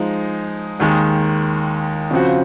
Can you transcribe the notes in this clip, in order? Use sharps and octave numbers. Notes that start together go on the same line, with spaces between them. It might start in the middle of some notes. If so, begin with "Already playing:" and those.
Already playing: F3 G#3 D#4
D#2 D#3 G#3
C#3 F3 C4 F#4